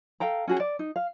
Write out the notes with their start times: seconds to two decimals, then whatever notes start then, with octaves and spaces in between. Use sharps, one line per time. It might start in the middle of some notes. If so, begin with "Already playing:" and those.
0.20 A4 F5 G5 A#5
0.48 C#4 F#4 G#4
0.60 D5
0.79 D#4
0.96 F5